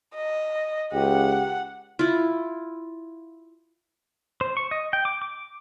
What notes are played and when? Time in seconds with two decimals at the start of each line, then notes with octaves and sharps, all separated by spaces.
0.15 D#5
0.93 C#2 G4 F#5
1.99 E4 F4
4.41 C5
4.57 C#6
4.71 D#5
4.93 G5
5.05 D6
5.22 D6